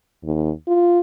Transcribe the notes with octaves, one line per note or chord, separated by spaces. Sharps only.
D#2
F4